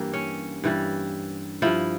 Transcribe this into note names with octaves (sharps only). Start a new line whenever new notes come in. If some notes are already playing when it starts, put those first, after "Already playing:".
Already playing: G2 E3 G3 A#3
C#4
G2 E3 G3
G2 F3 E4